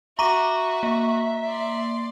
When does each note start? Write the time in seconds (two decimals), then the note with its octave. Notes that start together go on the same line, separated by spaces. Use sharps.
0.19 F#4 E5 A#5 C#6 D6 D#7
0.83 A#3
1.45 D5 C6